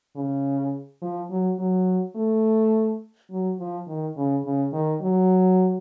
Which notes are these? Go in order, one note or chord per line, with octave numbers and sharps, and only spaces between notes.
C#3
F3
F#3
F#3
A3
F#3
F3
D#3
C#3
C#3
D#3
F#3